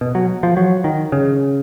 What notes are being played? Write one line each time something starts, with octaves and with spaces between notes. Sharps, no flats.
B2
F#3
F3
F#3
D#3
C#3